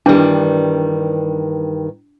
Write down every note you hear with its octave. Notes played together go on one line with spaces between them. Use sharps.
G2 D#3 E3 G3 D4